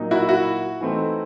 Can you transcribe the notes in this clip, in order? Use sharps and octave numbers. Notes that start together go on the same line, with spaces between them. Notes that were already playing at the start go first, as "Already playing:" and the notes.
Already playing: A#2 F#3 A#3 D#4
E4 F#4
E4 F#4
E3 A3 C4 D#4